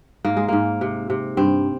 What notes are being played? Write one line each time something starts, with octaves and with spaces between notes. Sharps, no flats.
G#2 A#3
G#3
G#2 A#3
C3
C3
G2 C4